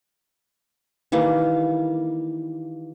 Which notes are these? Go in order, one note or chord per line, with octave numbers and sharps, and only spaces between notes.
D#3 E3 G3 A#3